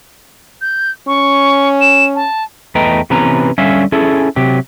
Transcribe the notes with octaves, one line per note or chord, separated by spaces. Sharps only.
G6
C#4 C#6
E7
A5
E2 A3 B4 D#5 G5 A#5
C3 E3 B3 C#4 B4 A#5
D3 G3 C#4 E5 F5 G#5
C#4 E4 G#4 A4
C3 F#3 G4